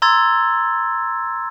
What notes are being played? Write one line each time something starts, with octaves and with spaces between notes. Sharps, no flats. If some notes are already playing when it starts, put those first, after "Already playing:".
A#5 C6 E6 G#6 A6